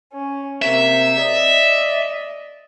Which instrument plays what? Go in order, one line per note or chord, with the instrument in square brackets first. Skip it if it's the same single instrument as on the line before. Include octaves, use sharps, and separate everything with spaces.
[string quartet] C#4
[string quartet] C3 A#3 [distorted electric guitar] E5
[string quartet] D5 D#5